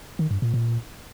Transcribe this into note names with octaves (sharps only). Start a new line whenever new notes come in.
D#3
G2
A#2
A#2